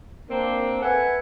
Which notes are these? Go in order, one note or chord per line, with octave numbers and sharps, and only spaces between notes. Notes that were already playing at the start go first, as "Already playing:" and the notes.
A#3 C4 D4
A4 B4 E5 F#5 G#5